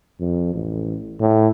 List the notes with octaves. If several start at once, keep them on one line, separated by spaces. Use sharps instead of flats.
F2
A1
A2